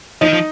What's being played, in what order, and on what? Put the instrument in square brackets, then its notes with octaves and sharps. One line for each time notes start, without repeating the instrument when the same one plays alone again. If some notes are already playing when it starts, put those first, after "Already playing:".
[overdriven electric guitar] F3 [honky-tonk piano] D#4
[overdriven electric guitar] D#3
F3